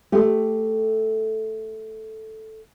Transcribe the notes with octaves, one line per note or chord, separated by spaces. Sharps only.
A3 G4